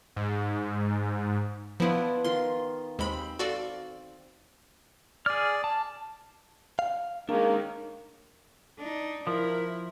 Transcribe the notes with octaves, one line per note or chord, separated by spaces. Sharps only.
G#2
F3 B3 D4 E4 F4
D#3 F4 C6
D#2 G#3 C4 B5
F#4 A4 D5 F5
G#4 D5 F6
A5
F5
D#3 G#3 A#3 C#4 D4
D4 D#4
F3 E4 A#4